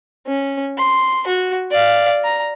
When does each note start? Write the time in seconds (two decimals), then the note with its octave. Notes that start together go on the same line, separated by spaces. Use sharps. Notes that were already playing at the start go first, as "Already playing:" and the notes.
0.27 C#4
0.78 C6
1.27 F#4
1.71 D5 F5
2.24 A#5